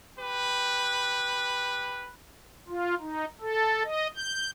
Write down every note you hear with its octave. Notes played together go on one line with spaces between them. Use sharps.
G4 B4
F4
D#4
A4
D#5
G6